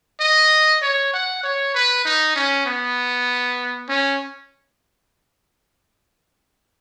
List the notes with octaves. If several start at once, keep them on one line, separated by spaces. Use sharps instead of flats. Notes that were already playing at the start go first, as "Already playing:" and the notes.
D#5
C#5
F#5
C#5
B4
D#4
C#4
B3
C#4